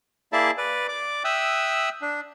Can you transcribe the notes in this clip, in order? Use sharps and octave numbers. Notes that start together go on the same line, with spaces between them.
A#3 E4 G#4 D5 E5 A5
B4 D5
D5 D6
E5 G5 D#6 E6 F#6
D4